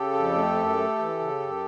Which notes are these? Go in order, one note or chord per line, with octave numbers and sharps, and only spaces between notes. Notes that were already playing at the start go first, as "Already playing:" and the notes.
Already playing: C#3 G4 A4
F2
A3
F#2
A3
E3
C#3
F#2